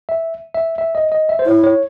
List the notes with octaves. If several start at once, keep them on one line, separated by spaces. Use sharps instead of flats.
E5
E5
E5
D#5
D#5
E5
C5
E4 C#5
C#5